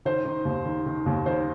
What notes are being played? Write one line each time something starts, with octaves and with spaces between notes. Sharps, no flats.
D#3 C5
D#3
D#2
D#3
D#3
D#2
D#3 C5